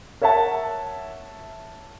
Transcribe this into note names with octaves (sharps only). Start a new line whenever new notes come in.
A#4 C#5 E5 F#5 A5